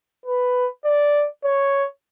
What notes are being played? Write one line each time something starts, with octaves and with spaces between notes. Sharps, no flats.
B4
D5
C#5